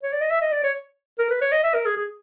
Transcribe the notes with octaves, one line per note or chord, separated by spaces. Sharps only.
C#5
D5
D#5
E5
D#5
D5
C#5
A#4
B4
C#5
D#5
E5
A#4
G#4
G#4